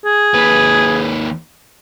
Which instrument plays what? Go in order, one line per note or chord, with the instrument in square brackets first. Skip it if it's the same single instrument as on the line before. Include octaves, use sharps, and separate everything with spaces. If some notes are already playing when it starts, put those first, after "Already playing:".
[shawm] G#4
[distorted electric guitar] D#2 B4